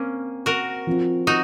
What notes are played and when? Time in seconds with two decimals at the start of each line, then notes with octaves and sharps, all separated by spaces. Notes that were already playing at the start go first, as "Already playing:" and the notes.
Already playing: A#3 C4 C#4
0.46 F#4 A#4
0.87 F3 C4 F4
1.27 D#4 F#4